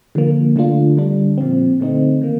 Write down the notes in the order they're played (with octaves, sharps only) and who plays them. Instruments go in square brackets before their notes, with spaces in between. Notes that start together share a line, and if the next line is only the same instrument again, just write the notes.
[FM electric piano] D3 F3 A#3
D3 A3 D4 F4
D3 G3 D4
A#2 F3 C4
D3 A3 C4 D#4
D#3 A#3